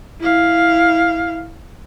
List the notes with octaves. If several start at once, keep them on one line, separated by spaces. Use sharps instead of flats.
E4 F5